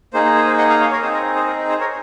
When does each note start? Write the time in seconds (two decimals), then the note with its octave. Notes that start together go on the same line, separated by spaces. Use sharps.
0.13 A#3 D#4 G#4 C5
0.25 C5
0.36 C5
0.47 C5
0.58 D#5 F#5
0.69 F5 G#5
0.80 C#5 F5
0.91 A#4 C#5
1.02 C4 D#4 G#4 C5
1.14 A#4
1.26 A#4
1.36 C5
1.47 A#4
1.58 A#4
1.70 C5
1.80 A#4 C#5